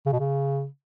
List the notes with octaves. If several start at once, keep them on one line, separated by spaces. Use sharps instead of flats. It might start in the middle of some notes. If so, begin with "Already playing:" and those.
C#3
B2
C#3